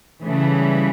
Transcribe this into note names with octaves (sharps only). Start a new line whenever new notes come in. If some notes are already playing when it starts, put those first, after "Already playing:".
C#3 E3 G3 A3